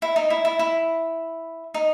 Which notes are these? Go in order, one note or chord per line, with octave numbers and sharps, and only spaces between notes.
E4
D#4
E4
E4
E4
D#4